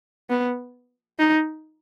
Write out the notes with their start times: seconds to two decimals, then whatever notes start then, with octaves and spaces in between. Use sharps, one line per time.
0.30 B3
1.19 D#4